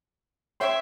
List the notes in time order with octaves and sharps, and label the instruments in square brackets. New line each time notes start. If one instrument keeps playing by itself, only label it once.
[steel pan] C#5 G5 C6 [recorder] E5